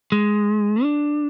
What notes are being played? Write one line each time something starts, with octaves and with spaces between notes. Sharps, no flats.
G#3
D4